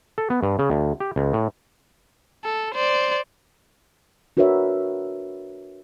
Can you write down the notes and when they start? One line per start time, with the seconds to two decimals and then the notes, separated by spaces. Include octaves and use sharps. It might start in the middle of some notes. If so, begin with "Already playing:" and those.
0.18 A4
0.30 B3
0.43 G2
0.59 C#3
0.70 D2
1.00 G4
1.16 C#2
1.33 A2
2.45 A4
2.74 C5 D5
4.37 D4 F#4 A#4 B4 C#5 E5